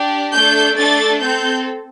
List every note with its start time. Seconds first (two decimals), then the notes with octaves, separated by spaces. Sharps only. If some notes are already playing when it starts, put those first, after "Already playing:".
Already playing: D4 G4
0.34 A3 D4 A4 G6
0.77 A3 D4 A4 A6
1.20 C4 A4 G6